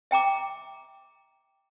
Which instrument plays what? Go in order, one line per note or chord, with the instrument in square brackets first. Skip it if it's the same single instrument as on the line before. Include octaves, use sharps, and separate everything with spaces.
[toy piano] E5 G5 A#5 D6